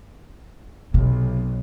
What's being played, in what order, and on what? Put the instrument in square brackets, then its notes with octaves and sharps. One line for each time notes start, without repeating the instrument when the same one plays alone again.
[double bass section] B1 [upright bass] C3